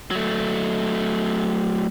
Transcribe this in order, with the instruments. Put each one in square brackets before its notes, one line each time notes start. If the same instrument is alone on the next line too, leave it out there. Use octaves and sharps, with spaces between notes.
[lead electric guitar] F#3 A3